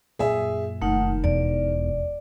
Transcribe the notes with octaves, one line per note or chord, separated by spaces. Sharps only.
F#2 A#2 G#4 E5
F1 D#3 A3 D#4 F#5
E1 E2 D5